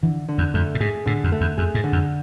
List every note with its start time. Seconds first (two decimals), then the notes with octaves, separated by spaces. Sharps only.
0.03 D3 E3
0.29 D3
0.38 E2
0.54 F2 A3
0.75 A2
0.80 G#2 G#4
1.06 A2 D3
1.24 F2
1.32 A3
1.41 E2
1.58 F2 G#4
1.75 G#2
1.84 D3
1.92 F2